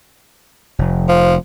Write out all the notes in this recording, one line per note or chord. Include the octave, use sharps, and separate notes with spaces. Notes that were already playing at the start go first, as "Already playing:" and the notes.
F1
F3